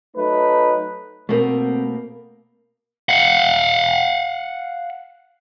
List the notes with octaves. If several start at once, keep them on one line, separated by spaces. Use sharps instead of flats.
F#3 A3 D#4 B4
B2 A3 A#3 C4
F5 F#5